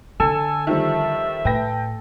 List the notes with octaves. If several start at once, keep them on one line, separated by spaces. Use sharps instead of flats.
D3 A4 G#5 E7
D#3 F3 G3 E5
A2 B4 G5 A#6